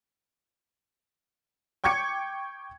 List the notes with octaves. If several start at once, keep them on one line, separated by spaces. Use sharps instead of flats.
G5 C#6 D6 G#6 C#7